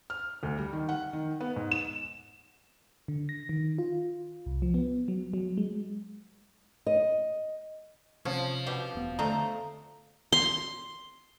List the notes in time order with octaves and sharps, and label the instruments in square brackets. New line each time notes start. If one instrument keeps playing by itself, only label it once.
[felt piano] F6
D2
G3
D#3
F#5
D#3
B3
G#2
E7
[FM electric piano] D3
A#6
D#3
F4
C2
F3
B3
F#3
F#3
G#3
[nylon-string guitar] D#5
[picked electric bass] C3 [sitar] F3 [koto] C#4
[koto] B2 G4 G5
[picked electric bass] E1 B3
[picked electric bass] D3 [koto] A3 C4 D#5 [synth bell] A#5
[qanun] C6